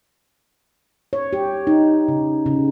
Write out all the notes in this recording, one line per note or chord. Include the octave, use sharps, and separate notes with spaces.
C#5
G4
D#4
C#3
C#3